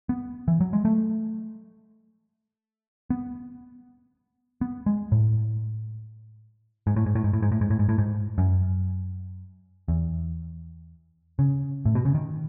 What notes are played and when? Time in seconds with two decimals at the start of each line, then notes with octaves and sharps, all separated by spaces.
0.09 B3
0.48 E3
0.61 F#3
0.73 G#3
0.85 A3
3.10 B3
4.61 B3
4.86 G#3
5.12 A2
6.87 G#2
6.96 A2
7.06 G#2
7.15 A2
7.24 G#2
7.33 A2
7.42 G#2
7.52 A2
7.61 G#2
7.70 A2
7.79 G#2
7.89 A2
7.98 G#2
8.38 F#2
9.88 E2
11.39 C#3
11.86 A2
11.95 B2
12.05 C#3
12.14 D#3